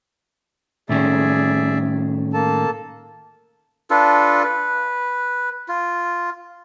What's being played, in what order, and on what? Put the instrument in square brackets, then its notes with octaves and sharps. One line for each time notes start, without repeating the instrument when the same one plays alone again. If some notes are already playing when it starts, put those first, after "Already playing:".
[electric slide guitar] A2 D#3 C#4 [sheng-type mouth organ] G#4 D5 E5
[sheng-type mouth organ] A#3 A4 A5
[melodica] D4 F4 A4 B4
B4
F4